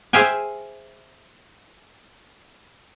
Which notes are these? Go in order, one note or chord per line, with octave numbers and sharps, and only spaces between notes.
G#4 C5 E5 F5 G5 G#5